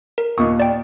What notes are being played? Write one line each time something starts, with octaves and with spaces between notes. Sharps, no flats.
A#4
D#2 A#2 C#6 D#6
D5 G5